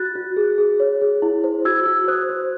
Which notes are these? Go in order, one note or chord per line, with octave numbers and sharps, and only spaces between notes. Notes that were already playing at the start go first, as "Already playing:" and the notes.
Already playing: F#4 F#6 A6
F#4
G#4
G#4
C#5
G#4
E4
C5
F#4 E6 G#6
F#4
C5 D#6 F#6
C5